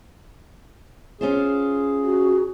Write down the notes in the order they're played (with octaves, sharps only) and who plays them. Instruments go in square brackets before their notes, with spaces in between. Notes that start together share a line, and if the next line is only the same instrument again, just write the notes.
[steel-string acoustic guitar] C#4 F4 C5 [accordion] G#4
[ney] F#4